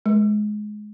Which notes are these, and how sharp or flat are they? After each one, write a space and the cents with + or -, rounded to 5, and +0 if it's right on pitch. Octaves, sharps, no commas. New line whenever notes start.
G#3 +20